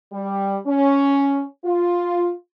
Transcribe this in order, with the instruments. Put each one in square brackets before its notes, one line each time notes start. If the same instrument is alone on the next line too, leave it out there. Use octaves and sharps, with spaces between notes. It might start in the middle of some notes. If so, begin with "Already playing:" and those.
[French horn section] G3
C#4
F4